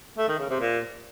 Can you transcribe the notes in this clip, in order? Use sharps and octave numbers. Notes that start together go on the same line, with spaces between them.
A3
D#3
C#3
C3
A#2